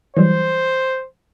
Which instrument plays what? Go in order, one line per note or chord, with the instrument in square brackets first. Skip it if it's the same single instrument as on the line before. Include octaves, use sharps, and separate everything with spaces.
[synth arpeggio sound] E3 F#3 G3 [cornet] C5